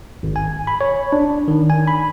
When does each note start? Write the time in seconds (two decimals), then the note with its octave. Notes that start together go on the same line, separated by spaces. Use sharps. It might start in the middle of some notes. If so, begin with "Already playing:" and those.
0.23 G#1
0.36 G#5
0.67 B5
0.81 C#5
1.12 D4
1.48 D#3
1.70 G#5
1.87 B5